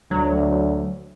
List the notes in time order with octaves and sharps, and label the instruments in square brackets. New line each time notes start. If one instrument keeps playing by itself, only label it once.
[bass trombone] D2 [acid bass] F#3